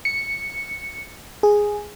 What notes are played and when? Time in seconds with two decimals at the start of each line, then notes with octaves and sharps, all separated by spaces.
0.05 C#7
1.43 G#4